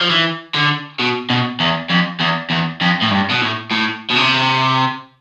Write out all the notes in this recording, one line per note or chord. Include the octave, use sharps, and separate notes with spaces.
F3
E3
D3
B2
B2
E2
F2
E2
E2
F2
A2
G2
B2
A2
A2
B2
C3